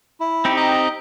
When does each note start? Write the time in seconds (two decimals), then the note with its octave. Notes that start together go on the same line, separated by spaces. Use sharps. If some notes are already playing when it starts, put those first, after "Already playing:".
0.20 E4
0.45 C4 D#4 G4
0.57 D#5 A#5